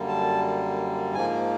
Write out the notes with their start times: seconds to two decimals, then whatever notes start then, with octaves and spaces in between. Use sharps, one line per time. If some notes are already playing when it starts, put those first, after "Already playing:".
Already playing: F#2 D3 G3 A#3
0.08 A5
1.14 G#2 F3 A#3 G#5